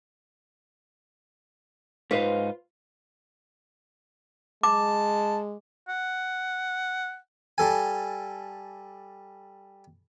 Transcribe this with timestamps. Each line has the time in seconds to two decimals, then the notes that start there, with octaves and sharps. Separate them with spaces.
2.11 G#2 D#4 F4 B4 C5 F5
4.63 G#3 A5 D6
5.88 F#5
7.58 G3 A4 G#5